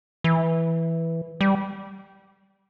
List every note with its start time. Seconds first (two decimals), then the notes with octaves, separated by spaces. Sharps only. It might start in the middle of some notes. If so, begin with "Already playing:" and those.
0.24 E3
1.41 G3